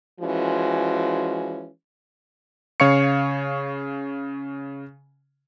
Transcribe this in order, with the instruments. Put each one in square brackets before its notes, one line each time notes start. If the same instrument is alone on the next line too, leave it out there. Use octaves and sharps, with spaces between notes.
[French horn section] E3 F3 G#3 C#4 F#4
[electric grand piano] C#3 C#5 F5 C#6 C#7